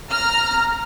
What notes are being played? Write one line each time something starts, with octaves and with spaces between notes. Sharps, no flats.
A#5 F6